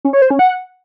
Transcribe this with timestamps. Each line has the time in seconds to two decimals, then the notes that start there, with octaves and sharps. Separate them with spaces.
0.05 C#4
0.13 C#5
0.22 C5
0.30 C#4
0.39 F#5